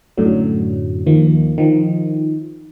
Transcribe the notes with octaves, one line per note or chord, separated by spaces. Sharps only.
F#2 A2 D3 F#3
D#2 D#3 F3 A#3
D#3 F3